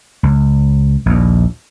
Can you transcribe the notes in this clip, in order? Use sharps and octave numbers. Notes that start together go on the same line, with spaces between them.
C#2
A#1 D#2